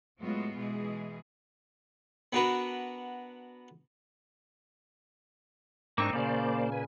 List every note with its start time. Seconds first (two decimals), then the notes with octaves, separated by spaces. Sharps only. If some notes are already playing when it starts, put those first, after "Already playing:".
0.20 A2 F#3 G#3 B3 F4 F#4
0.57 B2 E3 G#3 G#4
2.33 B3 D4 F#4 A#4 B4
5.98 G#2 A#3 C4 D4 D#4 C#6
6.13 A#2 C#3 A#3 C5 D5
6.72 B4 G#5